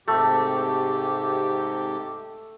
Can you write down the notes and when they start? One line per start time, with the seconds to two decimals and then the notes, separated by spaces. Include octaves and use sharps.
0.08 G#2 C3 A3 G4